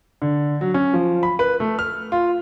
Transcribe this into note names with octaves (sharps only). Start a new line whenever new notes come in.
D3
F#3
C#4
F3
B5
B4
A3
F6
F4